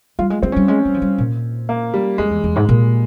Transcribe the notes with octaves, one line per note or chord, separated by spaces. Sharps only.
G3 F4
G#3
G#3 C4
C#4
G3
G#3 C#4
G3
F3
G3
A#2
A#3
G3
F2 G#3
E2
E2
G#2
A#2